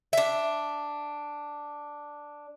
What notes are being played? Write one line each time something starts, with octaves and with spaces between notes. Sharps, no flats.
D4 E5